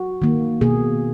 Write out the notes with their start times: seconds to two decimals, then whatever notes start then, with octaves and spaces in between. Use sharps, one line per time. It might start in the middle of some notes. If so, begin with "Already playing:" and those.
Already playing: F#4
0.22 D#3 A#3
0.61 B2 A#3 G#4